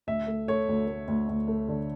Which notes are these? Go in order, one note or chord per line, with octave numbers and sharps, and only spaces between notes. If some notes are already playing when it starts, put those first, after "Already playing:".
D2 E5
A3
A3 C#5
D2
A3
D2
D2
A3
D3